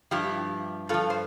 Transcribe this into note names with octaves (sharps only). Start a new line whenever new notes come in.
G2 F3 E4 G4
G2 F3 F4 A4
C5